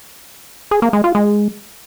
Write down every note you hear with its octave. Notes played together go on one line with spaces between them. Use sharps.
G#4
A#3
G#3
F4
G#3